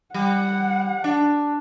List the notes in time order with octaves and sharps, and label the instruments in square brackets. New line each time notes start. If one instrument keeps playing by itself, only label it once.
[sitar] G3 [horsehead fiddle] F#5
[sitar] D4